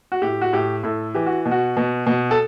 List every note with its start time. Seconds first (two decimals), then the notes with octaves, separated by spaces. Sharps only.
0.12 F#4
0.22 A2 G4
0.41 F#4
0.53 A2 G4
0.84 A2 A4
1.15 E3 G4
1.26 F#4
1.46 B2
1.51 F#4
1.77 B2
2.07 B2
2.31 A4